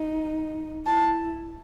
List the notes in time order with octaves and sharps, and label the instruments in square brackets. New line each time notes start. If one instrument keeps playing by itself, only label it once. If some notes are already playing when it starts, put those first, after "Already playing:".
Already playing: [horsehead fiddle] D#4
[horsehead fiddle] E4 [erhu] A5